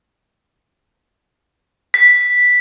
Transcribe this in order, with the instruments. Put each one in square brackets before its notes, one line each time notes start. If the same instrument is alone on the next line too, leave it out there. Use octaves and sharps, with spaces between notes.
[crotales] B6